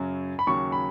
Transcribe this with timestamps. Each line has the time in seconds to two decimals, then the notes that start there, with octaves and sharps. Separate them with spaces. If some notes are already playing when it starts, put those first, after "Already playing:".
Already playing: F#2 C#3 F#3
0.39 B5
0.47 D#2 C#3 F#3 C#6
0.72 B5